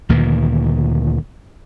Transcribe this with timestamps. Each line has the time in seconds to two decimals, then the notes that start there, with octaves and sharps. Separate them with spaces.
0.09 D2 A#2 D#3 E3